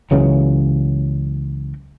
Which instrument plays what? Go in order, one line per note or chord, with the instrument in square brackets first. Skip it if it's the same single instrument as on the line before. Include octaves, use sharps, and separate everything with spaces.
[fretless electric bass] C#2 C#3 E3 F#3